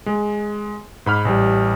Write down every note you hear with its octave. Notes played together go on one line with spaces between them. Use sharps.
G#3
G#2 B5 F6
A1 G3